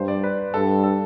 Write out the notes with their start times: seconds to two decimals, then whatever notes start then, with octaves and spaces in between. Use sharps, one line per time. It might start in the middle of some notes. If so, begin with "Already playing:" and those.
Already playing: G2 C5
0.08 D5
0.23 B4
0.53 G2 A4
0.84 A4